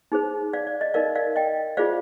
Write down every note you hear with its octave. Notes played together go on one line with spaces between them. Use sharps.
D#4 G#4 C5
D5 F5
D5
D#5
D#4 A#4 D5 F5
D5 F5
D#5 G5
F4 G#4 C5 D5 F5